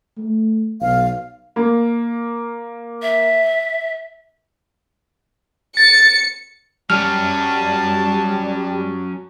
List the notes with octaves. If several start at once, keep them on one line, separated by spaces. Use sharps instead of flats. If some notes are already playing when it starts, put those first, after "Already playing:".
A3
B1 F5
A#3
E5
A6 C#7
F#3 G3 C#4 A5 F6